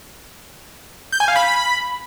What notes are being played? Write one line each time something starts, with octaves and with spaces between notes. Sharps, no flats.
G6
G#5
F5
B5